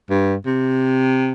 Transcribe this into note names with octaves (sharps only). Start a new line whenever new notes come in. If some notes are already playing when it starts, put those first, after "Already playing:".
G2
C3